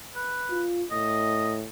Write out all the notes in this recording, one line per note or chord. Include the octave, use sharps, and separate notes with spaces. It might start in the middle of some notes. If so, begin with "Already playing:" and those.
B4
F4
A2 D#5